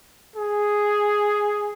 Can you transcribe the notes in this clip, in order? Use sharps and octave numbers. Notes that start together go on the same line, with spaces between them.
G#4